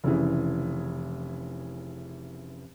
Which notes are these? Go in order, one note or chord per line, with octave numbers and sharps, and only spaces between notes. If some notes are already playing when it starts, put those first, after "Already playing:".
F1 C#3 E3